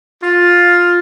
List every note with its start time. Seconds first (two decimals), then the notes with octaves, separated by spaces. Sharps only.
0.23 F4